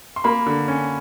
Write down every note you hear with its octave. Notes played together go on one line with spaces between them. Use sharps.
C6
A#3 B5
D3
C#4